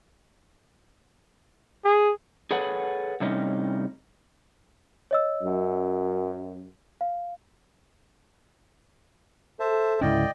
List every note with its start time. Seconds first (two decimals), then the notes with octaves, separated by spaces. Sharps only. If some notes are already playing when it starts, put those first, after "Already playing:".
1.85 G#4
2.51 G#4 A4 B4 C#5 F#5
3.20 A2 C3 G3 C#4 D#4
5.11 C#5 D#5 E6
5.41 F#2
7.01 F5
9.60 A4 C5 E5 A5
10.01 C#2 G#2 D3 C#4 E4 D5 D#5 G5